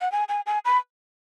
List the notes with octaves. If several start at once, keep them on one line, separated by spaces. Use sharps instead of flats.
F#5
G#5
G#5
G#5
B5